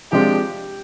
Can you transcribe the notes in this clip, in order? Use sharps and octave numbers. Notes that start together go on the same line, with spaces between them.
C3 F3 G#3 D4 F4 G4